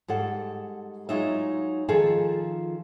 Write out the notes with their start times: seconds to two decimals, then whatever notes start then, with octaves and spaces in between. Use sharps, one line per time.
0.08 G#2 G3 A4 F#5
1.09 F#3 G#3 D#4 F4 E5
1.89 D#3 F3 F4 G#4 A4